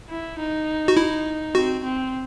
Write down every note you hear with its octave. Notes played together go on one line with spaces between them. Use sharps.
E4
D#4
F#4
E4
C4 F#4
C4